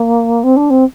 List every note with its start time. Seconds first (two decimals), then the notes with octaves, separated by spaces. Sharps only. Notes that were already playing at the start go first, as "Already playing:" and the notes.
Already playing: A#3
0.43 C4
0.56 D4
0.70 C4